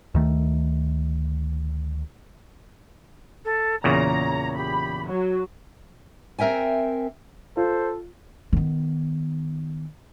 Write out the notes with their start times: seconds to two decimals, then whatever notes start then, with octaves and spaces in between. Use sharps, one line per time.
0.15 D2 D#3 A3
3.44 A4
3.84 E2 A#2 C#3 C#5 A#5
4.57 G4 B5
5.08 F#3 C#5
6.39 C4 A#4 E5 G5 G#5
7.57 F4 A4 C5
8.53 D#3 B3